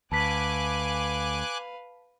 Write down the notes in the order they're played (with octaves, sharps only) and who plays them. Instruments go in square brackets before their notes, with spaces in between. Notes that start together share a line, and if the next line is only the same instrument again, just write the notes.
[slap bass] D2 [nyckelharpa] B4 F5 [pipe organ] G#5 D6 F#6 [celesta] A5 B6